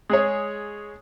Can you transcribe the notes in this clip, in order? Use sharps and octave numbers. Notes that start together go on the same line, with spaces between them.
G#3 G#4 C#5